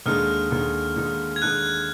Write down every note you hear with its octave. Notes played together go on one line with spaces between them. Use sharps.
D#2 D3 G#3 D#4 F6
D#2 D3 G#3 D#4
D#2 D3 G#3 D#4
G#6
D#2 D3 G#3 D#4 F#6